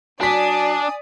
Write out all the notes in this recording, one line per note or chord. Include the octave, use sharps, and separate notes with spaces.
F#3 D4 D5 G#5 D#6 B6